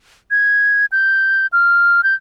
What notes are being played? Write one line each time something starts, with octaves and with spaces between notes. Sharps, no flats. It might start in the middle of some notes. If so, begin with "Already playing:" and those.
G#6
G6
F6
G6